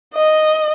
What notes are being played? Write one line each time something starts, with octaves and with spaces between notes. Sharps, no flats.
D#5